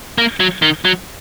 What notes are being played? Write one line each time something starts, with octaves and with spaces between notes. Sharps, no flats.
A#3
F#3
D#3
F#3